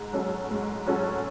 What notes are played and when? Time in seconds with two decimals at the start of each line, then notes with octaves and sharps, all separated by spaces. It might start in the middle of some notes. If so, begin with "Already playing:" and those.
Already playing: G#2
0.13 F#3 C#4 F#4 A4
0.51 G#2
0.87 F#3 C#4 F#4 A4